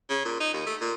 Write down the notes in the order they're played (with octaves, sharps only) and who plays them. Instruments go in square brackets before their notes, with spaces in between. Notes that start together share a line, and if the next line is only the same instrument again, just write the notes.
[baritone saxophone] C#3
A#2
D#4
D#2
A3
A#2